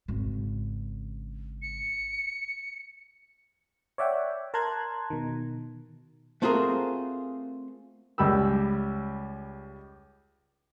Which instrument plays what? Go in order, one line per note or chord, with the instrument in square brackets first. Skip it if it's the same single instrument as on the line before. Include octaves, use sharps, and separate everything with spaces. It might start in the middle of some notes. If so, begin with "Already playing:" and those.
[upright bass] G#1 C#3
[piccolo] C#7
[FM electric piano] C#5 D5 E5 F#5 G5
A#4 A5 A#5 C6 F#6 G#6
B2 D#3
[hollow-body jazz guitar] A3 C4 F4 F#4 G#4 A#4
[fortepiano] C#2 G3 B5 E6